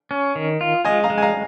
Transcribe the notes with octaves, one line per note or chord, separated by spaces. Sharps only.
C#4
D#3
F4
G#3 D#5 G#5
F5 A#5
G#3
G#5
F5 A#5